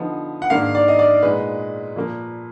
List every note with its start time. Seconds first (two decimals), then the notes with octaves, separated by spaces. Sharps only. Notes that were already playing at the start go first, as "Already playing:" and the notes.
Already playing: D3 F3 B3 D#4
0.42 F#5
0.50 G#2 D#3 A#3 D4 F5
0.75 D5
0.88 D#5
0.99 D5
1.22 A#2 G#3 B3 D#4 B4
1.96 A#2 F3 A#3